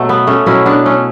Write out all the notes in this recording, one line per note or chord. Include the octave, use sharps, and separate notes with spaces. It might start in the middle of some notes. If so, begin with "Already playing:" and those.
Already playing: B2 F#3 A3
B3
A3 C#4
B2 F#3 C#4 E4
B3 D4
A3 C#4